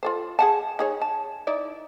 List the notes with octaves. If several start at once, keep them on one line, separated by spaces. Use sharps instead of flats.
F4 A4 C5
G#4 F#5 A5
D#4 G#4 C#5
A5
D#4 E4 D5